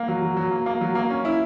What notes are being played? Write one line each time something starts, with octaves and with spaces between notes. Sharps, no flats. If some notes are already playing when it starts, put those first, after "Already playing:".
Already playing: A#3
F#3
F#3
F#3
A#3
A#3
F#3
A#3
C#4
E4